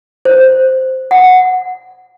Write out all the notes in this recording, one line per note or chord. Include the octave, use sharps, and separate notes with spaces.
C5
F#5